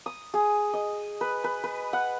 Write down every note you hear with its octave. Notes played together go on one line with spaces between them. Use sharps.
D#6
G#4
D#5
B4
B4
B4
F#5